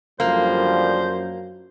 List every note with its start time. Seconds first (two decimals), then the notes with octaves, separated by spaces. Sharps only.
0.20 F#2 D3 F3 G3 A#3 C5